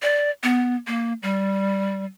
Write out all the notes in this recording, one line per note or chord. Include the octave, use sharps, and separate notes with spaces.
D5
B3
A#3
G3